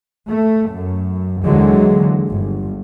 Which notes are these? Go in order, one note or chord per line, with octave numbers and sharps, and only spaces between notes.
A3
F#2
D#2 D3 E3 F#3 G#3
G1